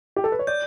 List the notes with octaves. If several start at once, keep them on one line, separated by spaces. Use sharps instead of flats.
G4
A4
B4
C#5
D5 G6